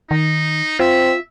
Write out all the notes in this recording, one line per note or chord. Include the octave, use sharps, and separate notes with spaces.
D#3 D#4
C4 F4 E5